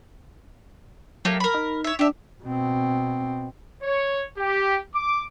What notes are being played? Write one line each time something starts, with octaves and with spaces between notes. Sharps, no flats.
F#3 A3 A#3 G4
A#4 B5
D#4
C#5 E5
D4 G4 E5
B2 C4
C#5
G4
D6